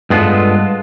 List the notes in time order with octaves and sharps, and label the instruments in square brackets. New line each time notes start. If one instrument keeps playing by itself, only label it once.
[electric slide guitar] G2 G#3 B3 F4 A4